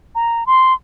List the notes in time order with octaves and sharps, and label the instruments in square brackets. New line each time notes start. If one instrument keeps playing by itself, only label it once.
[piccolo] A#5
C6